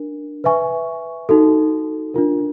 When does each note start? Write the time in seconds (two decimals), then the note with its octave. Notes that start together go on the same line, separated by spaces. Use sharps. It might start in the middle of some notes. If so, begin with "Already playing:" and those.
Already playing: D4 A#4
0.44 B4 E5 G#5 C#6
1.29 D#4 F#4 A4
2.14 D4 F4 A#4